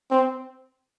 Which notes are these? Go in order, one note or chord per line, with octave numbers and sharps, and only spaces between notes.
C4